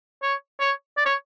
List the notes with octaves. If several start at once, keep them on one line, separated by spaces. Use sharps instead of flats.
C#5
C#5
D5
C#5